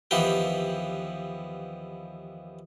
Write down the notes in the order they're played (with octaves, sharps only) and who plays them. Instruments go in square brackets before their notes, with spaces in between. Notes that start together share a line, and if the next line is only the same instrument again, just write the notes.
[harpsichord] D#2 E3 F3 B3 G4 G5